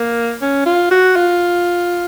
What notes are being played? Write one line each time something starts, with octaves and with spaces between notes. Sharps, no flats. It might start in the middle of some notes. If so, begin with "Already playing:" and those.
Already playing: A#3
C#4
F4
F#4
F4